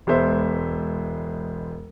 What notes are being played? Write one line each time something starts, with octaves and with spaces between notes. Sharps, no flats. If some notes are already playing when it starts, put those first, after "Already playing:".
E1 G#3 B3 C5 E5